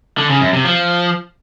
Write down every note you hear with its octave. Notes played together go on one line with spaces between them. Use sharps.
D3
C#3
F#2
C3
F3